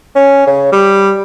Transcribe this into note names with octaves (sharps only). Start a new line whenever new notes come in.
C#4
C#3
G3